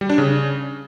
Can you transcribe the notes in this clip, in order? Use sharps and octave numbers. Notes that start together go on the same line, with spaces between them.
G3
D4
C#3